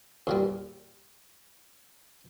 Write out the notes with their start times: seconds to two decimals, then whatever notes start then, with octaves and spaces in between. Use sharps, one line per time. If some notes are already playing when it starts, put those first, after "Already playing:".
0.27 E2 A#2 G3